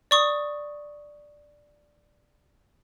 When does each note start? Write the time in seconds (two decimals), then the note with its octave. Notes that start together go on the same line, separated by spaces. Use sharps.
0.11 D5 C#6 D#6